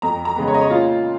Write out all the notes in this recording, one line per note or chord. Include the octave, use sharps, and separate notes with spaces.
F2 A#5
A#5
C#3 G#3 B3
C#5
D#5
C#5
A#2 F4